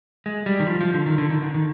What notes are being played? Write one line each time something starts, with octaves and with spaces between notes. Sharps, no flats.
G#3
G3
D#3
F3
F3
D3
D#3
D3
D#3
D3
D#3